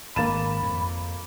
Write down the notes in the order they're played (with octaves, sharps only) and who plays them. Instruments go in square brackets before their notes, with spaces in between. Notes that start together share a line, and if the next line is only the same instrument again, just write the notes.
[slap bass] G#1 [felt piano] A#3 A6 E7 [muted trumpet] B5
[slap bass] F2